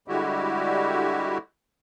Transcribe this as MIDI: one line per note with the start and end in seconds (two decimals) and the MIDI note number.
0.08 1.38 50
0.08 1.38 55
0.08 1.38 56
0.08 1.38 64
0.08 1.38 66
0.08 1.38 67